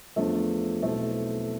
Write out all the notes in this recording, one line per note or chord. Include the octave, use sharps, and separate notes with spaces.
E2 D3 F3 A3
B1 B2 A3 C4 E4